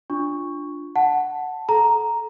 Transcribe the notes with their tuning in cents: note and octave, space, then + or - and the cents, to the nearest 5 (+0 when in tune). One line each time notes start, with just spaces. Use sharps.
D4 +0 F4 +0 C#6 +0
F#5 +0 A5 +0
A4 -30 A#5 +0